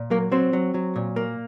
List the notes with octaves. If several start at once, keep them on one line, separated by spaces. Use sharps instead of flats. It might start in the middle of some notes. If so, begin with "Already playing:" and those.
Already playing: A#2
F#3 A#3 A#4
F#3 C4 C5
F#3
F#3
A#2
A#3